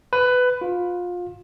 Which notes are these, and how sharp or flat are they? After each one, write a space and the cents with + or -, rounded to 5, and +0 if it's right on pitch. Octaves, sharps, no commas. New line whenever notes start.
B4 +15
F4 +25